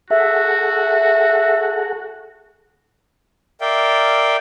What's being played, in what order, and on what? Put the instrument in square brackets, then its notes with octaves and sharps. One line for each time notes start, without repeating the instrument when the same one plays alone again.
[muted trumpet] F#4 [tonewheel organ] G#4 A4 F#5 [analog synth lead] E5
[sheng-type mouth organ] A#4 D5 E5 F5 G5